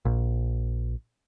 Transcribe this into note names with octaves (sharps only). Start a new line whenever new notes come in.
A#1